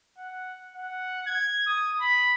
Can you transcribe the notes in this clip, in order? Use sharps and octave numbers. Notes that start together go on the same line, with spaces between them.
F#5
F#5
G#6
D#6
B5